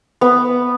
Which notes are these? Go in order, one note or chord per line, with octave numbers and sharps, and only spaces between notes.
B3